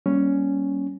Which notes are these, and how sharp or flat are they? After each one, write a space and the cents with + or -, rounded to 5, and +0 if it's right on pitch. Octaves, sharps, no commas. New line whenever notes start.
G3 +0 A#3 +25 C#4 +0